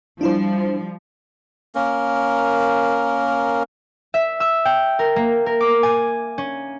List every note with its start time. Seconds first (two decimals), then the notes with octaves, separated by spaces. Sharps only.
0.21 F3 G3 D4 E4 C5
1.75 A#3 C#4 A#4
4.14 E5
4.40 E6
4.65 G5
4.99 A#4
5.16 A#3
5.46 A#4
5.61 D6
5.83 G#5
6.38 C#4